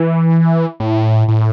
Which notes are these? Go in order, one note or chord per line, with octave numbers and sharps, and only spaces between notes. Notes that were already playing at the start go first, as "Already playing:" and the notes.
Already playing: E3
A2
A2